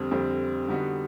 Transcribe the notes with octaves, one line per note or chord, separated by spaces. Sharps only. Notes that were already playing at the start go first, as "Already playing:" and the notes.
Already playing: F2 D3 G3 C4
F2 D3 G3 C4
D3 G3 B3 D#4 F#4